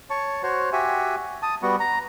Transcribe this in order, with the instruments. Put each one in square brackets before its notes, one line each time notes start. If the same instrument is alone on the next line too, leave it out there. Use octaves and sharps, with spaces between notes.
[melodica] C#5 A5 C#6
F#4 C5 C#5
F#4 G4 E5 G#5
A5 D#6
G3 B3 F#4
A#5